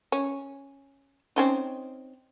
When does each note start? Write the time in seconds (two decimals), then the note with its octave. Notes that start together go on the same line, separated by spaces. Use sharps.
0.12 C#4
1.36 C4 C#4 D#4